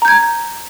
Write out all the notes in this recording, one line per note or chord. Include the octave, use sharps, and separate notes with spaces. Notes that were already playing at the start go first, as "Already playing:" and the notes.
A#5 G6 G#6